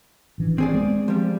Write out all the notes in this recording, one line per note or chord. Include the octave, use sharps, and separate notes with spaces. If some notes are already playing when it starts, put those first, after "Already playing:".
A1 E3 D4
C4 G#4 D5
G#3 B3
F3 G3